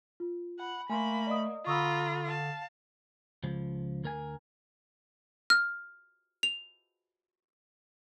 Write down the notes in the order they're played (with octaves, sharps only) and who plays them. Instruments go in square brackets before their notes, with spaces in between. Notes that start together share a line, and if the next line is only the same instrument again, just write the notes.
[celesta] F4
[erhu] F#5 [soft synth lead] B5
[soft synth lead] A3 [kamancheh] A#3 [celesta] G#5 C6 [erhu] B5
[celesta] D5 D#5 D#6
[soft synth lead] D3 [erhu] F4 [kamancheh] A#5 B5 [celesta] C#6 D#6 E6
[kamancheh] F5 A5
[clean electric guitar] C#2 F3
D2 A#4 G#5
[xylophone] F6
F7